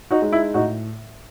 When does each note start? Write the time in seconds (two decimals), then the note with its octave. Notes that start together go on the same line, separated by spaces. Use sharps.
0.11 D#4 F#4
0.22 G#3 D#4
0.33 E4
0.54 A2 D#4 F#4